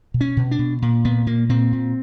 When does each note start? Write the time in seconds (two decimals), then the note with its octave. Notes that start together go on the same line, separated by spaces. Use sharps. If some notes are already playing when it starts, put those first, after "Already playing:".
0.14 B2
0.21 C#4
0.37 B2
0.51 D4
0.59 B2
0.82 A#2
1.05 A#2 B3
1.27 A#2 A#3
1.49 A#2 C4
1.73 A#2